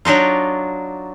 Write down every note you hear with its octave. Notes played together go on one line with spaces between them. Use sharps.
F#3 D4 D#4 F4